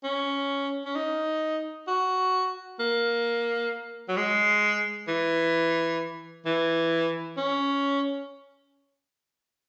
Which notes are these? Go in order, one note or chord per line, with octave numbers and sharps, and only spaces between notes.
C#4
C#4
D#4
F#4
A#3
F#3
G#3
E3
E3
C#4